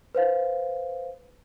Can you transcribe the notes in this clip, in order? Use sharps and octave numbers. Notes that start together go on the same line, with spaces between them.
B4 C5 F5